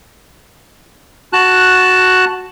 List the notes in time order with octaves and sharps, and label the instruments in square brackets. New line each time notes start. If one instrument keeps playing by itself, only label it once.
[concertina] F#4 A5 F#6